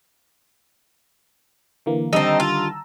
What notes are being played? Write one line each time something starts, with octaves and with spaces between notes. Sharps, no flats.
D3 E3 A#3
D3 D#3 G3 C4 D#4 A5 A#5 E6
F4